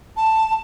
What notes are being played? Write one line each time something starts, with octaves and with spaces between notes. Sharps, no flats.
A5